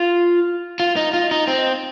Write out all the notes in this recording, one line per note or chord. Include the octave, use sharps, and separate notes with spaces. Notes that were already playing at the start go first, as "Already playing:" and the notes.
Already playing: F4
F4
D#4
F4
D#4
C4